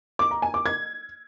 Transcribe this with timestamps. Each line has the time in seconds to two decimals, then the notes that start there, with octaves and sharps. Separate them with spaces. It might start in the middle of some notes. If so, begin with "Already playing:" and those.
0.19 D6
0.31 A#5
0.42 G#5
0.54 D6
0.66 G#6